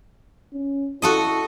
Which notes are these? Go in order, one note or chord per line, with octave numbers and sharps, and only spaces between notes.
C#4
E4 F#4 A4 D#5